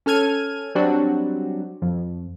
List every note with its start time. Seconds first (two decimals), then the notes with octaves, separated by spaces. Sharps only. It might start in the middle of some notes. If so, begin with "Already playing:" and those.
0.06 C#4 A4 F6 G#6 D#7
0.75 F#3 G3 C4 D4 F#4
1.82 F2